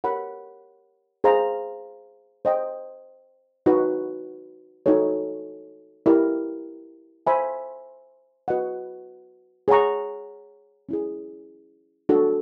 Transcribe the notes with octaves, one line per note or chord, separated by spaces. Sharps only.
G4 A#4 C#5 F#5 B5
G#4 C5 F5 A#5
C5 D#5 G5
D#4 F#4 B4
D#4 F#4 A4 C#5
E4 G4 A#4 D5
C5 E5 G#5 B5
F#4 B4 D#5 F#5
G#4 C#5 F#5 A#5 C#6
C#4 E4 G#4
D4 F#4 A4